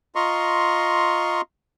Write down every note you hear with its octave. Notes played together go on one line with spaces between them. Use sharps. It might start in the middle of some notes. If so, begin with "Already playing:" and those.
F4 D#5 A#5 C6 C#6